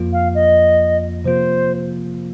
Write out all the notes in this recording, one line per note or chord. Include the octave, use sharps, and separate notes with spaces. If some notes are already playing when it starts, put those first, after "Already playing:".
Already playing: F2 F3 A#3 F4
F5
D#5
C3 F3 A#3 F4 C5